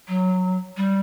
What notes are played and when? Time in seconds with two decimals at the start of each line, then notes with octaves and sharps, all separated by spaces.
0.08 F#3
0.77 G3